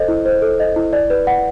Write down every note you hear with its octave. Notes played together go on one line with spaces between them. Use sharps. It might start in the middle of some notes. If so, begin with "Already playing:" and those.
Already playing: A4 C5 D#5
E4
C5
A4
D#5
E4
D5
B4
F#5